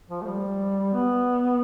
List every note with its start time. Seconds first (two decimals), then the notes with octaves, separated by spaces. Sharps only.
0.10 F3
0.22 A3
0.26 G3
0.93 B3